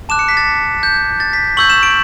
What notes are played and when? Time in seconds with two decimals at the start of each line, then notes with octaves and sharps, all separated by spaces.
0.09 A5 D6 F#6 E7
0.19 C#7
0.28 B6
0.37 A6
0.83 G6
1.20 A6
1.33 B6
1.57 C#6 E6 G6 F#7
1.70 E7
1.83 D7